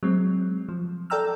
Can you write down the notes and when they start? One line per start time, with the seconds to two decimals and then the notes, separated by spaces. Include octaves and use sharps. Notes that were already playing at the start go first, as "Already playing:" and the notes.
0.03 F#3 G#3 C4
0.69 F3
1.10 A4 D5 G5 A#5 E6 F6